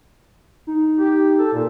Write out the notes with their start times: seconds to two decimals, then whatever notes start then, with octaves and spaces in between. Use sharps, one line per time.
0.67 D#4
0.98 G4
1.39 A4
1.53 A#2